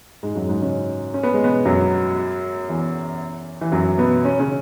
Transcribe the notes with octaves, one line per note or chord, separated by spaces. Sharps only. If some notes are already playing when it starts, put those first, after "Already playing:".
G#2 G#3
F#2 F#3
G#2 G#3
C#3 C#4
C#4
B3
G#3
B2 B3
F#2 F#3
E2 E3
E3
F#2 F#3
B2 B3
C#4
C#3 C#4